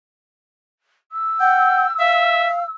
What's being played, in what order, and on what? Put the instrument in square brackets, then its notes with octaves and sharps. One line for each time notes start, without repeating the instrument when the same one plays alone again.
[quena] E6
[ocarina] F#5 [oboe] G5
[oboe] E5 [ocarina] F5